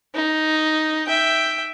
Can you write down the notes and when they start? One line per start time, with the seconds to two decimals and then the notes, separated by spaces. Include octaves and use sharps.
0.15 D#4
1.07 E5 G5